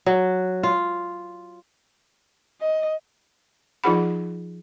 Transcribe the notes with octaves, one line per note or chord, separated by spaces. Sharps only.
F#3
F4
D#5
F3 D#4 F4 G#4 F#5 B5